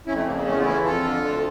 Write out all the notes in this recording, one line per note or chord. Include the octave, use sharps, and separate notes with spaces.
F2 C#4 E4
A3
C#3 A#3
A#3
E2 A3 C#4
F4
E3 C#4 E4
F2 F4 A4
D3
D2